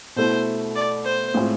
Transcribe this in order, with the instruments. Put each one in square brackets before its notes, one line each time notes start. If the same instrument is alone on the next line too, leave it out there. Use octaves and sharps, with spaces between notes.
[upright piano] B2 A3 E4 [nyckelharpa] C5
[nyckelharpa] D5
C5
[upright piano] A2 G#3 C4 F4